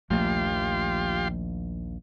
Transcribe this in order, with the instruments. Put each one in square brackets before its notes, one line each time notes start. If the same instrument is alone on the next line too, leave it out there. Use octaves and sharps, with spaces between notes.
[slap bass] A#1 D#2 [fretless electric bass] F3 A3 A#3 [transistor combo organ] F4 G4 C6